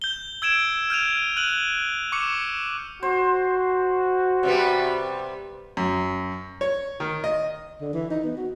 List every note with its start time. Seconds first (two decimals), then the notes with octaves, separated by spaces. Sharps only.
0.02 G6 G7
0.42 E6 G#6 D7 E7
0.90 F6 G6 D#7 F7
1.36 F6 F#6 D#7 F#7
2.12 C#6 D6 C#7
3.03 F#4 C5
4.43 C3 G3 B3
5.77 F#2
6.61 C#5
7.00 D#3
7.24 D#5
7.81 D3
7.93 E3
8.10 D#4
8.24 B3
8.37 F#4